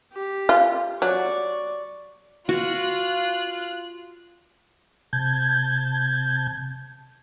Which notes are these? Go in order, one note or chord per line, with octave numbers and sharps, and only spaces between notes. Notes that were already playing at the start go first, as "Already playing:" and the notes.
G4
F4
F#3 D5 C#6
F4 F#4 F#6
C3 A5 G6 G#6